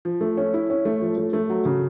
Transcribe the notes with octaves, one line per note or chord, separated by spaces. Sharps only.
F3
A3
C#4
E4
C#4
A3
F3
A3
A3
F#3
C#3